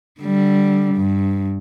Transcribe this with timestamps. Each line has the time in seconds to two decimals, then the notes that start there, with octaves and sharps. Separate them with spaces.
0.21 D3 G3
0.96 G2